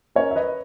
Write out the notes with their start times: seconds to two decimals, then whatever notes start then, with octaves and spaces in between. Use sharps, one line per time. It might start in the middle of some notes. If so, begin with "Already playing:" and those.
0.15 C#4 A#4 C#5
0.31 E5
0.36 B4 D#5